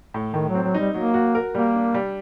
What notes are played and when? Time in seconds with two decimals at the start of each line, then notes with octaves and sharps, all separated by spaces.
0.14 A2
0.34 A2 D#3
0.49 F#3
0.55 C4
0.64 F#3
0.74 G3 D#4
0.94 F#3 A#3
1.14 F#4
1.35 A#4
1.55 G3 A#3
1.75 D4
1.94 G3